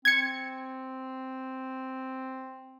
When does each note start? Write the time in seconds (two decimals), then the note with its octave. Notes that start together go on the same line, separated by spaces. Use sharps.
0.05 C4 G#6 C#7